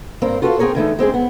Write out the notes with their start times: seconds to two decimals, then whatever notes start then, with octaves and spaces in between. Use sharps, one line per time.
0.22 G2 A#3 C4 A#4
0.42 F4 F#4 A4 B4 E5 F5
0.59 C4 C#4 G#4 A#4 C#5
0.75 D3 E3 A3 D#4
0.99 G#3 C4 C#4 G#4
1.14 B3